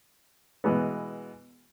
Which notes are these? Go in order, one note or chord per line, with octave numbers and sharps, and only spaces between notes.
B2 E3 G#3 B3